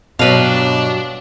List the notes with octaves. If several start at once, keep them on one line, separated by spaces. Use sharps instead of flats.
G2 B2 F#3 D4 B4 F5